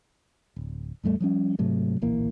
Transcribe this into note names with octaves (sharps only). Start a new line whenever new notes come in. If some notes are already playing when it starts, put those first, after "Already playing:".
D1
E2 A2 G3 A3
F3 G3 C#4
G#2 C3 F#3 A3
D1 A#1 E3 A#3